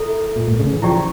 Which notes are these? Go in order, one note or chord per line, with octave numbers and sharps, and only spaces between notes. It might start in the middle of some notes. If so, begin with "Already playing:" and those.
Already playing: E4 A4 E5
A#2
A2
C#3
E3
F3 E4 G4 D5 G5 C#6